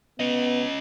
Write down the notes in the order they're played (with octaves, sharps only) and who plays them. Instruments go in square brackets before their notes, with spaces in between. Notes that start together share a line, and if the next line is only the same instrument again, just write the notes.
[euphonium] B3 [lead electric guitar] C#4 D#5